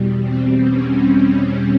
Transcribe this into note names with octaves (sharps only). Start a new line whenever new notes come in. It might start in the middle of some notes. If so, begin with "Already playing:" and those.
Already playing: E2 B2 G3
C4
C#4